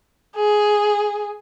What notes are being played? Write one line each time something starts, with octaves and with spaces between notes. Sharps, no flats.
G#4